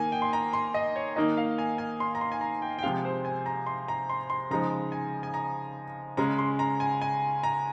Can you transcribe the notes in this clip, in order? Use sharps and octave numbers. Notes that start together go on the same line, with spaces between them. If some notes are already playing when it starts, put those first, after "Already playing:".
Already playing: D#3 A#3 D#4 G#5
G5
C6
A#5
C6
D#5
C#5
D#3 A#3 D#4 D#5
F5
G#5
G#5
C6
A#5
C6
G#5
A#5
G5
G5
C3 F3 G#3 C4 F5
C5
G#5
A#5
C6
A#5
C6
C6
C#3 F3 G#3 D#4 A#5
G#5
G#5
A#5
C#3 G#3 C#4 A#5
C6
A#5
G#5
G#5
A#5